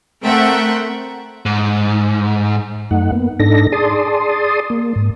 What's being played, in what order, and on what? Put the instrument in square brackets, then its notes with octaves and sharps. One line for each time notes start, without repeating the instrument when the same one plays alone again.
[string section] A3 C4 A#4 E5 F#5 G5
[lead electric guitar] G#2
[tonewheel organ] F#2 A3 D#4 F#5
A#3 B3
G#2 D4 D#4 A4 A#6
G#4 D5 A5 C6 D#6
A#3
G#2